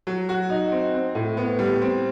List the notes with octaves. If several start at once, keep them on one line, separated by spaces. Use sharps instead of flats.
F#3
F#4
D#4
C4
C4
A2
B3
G3
C4